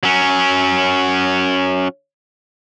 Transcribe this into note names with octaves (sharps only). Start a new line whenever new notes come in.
F#3 C#4